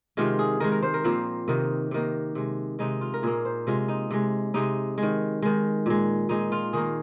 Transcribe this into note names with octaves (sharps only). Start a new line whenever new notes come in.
C3 D#3 G#3 F4
G#4
D#3 G#3 A#4
A#4
C5
A#4
A#2 F3 A#3 C4
C3 D#3 A#3 D#4
C3 D#3 A#3
C3 G#3
C3 G#3 D#4
F4
A#4
A#2 A#3 G#4
C5
C3 G#3 F4
D#4
C3 G#3
C3 G#3 D#4
D#3 G#3
D#3 G#3
A#2 G#3
A#2 G#3 D#4
F4
D#3 A#3 G#4